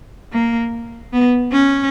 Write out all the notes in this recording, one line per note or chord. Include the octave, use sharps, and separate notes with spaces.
A#3
B3
C#4